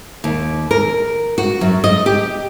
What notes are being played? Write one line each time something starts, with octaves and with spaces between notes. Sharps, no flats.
D#2
A#4
F#4
F#2
D#5
G4